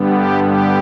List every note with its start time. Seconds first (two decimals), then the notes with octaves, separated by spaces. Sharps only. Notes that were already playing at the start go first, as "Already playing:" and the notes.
Already playing: G2 D3 G3 B3
0.12 G4
0.43 G4